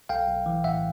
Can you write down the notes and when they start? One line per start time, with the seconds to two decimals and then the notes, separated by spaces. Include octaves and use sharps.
0.09 B1 F5 G5
0.28 B1
0.46 E3
0.64 A2 E5 F#5